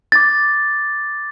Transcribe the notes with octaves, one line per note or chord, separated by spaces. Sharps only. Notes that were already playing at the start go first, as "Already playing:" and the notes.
D6 A6